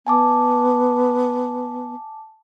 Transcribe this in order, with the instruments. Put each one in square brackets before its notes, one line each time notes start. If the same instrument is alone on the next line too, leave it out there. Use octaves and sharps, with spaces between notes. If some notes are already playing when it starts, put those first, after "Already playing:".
[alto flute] B3 [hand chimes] G#5 A5 D6